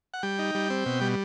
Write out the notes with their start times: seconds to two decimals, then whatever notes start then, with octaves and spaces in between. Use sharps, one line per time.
0.14 F#5
0.23 G3 G5
0.39 D#4
0.55 G3
0.70 C4
0.86 B2
1.01 G3